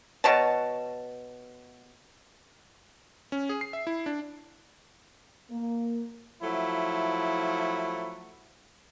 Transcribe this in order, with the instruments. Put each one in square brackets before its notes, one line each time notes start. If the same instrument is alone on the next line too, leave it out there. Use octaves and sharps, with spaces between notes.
[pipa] B2 C#5 A5
[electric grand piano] C#4
G#4
C7
E5
E4
D4
[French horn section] A#3
[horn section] F3 F#3 A3 E4